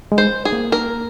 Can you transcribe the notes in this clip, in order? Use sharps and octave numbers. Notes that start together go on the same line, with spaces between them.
G#3
C5
G#4
A#3
A#4